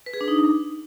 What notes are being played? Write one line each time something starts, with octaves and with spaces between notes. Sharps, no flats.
B4
G#4
D4
D#4